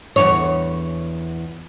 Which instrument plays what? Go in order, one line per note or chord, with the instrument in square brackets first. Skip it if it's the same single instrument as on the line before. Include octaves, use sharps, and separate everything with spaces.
[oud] E2 A#2 C#5